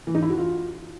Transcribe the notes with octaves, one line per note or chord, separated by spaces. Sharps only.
E3
D#4
E4
F#4
F4